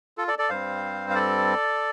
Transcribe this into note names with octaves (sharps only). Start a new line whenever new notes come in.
F4 A4
A4 D5
A4 D5
G2 G3 C4 C5 F5
F5
A4 D5